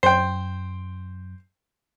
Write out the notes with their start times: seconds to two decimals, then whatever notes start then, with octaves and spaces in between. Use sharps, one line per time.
0.03 F#2 C5 G5